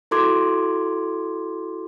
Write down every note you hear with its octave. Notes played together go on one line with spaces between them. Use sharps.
E4 F#4 A4 C6 D6 G#6